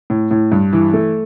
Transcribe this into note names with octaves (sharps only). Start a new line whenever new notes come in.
A2
A2
G2
E3
A3